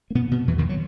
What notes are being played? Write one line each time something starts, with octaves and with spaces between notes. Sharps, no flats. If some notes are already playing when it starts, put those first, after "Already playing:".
A#3
B2 B3
B2 B3
E2 E3
D#2 D#3
F#3